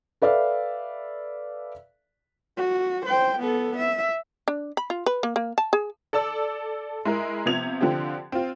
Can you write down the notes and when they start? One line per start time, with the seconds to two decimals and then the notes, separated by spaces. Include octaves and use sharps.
0.22 A4 B4 D5 E5 F5
2.57 F#4
3.06 C5 G5
3.40 B3 A4
3.77 E5
4.48 D4
4.77 B5
4.90 F4
5.06 B4
5.23 A#3
5.36 A#3
5.58 A5
5.73 G#4
6.13 A4 D5 A5 E6
7.05 G#3 E4 A#4
7.46 C3 F3 B3 G#6 F7
7.81 D3 F3 C4 G4
8.32 C4 F4